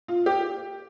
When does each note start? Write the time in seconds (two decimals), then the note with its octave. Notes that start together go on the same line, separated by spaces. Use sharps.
0.08 F4
0.26 G4